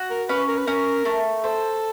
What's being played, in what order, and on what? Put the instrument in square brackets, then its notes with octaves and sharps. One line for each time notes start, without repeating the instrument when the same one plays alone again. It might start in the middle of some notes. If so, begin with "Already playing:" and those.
Already playing: [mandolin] F#4
[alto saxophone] A#4
[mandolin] C#4 [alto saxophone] B4
[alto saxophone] A#4
B4
[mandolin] C#4 [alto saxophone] A#4
[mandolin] A3
[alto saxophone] A4 [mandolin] C5